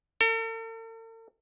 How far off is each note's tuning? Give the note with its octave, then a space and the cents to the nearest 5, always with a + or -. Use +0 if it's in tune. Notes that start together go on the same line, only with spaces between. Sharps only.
A4 +45